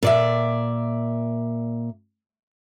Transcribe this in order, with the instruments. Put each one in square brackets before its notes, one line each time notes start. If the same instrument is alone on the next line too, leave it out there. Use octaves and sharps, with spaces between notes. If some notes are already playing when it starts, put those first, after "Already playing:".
[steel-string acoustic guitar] A#2 D5 E5